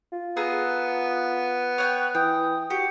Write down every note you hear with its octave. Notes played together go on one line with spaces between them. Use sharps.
F4
B3 G#4 A4 A#5
C#5 F#5 G5 F#6
E3 G5 D#6
F#4 G4 C#7